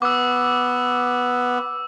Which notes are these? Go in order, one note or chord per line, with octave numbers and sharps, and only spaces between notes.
B3 D6 E6